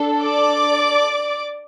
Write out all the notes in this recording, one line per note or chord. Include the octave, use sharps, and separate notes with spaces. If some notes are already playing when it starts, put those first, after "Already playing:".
Already playing: D4 A4
D5 D6